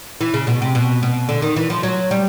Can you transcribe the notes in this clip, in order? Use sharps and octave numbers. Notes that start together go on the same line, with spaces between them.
E3
C#3
B2
C3
B2
B2
D3
D#3
E3
F3
F#3
G3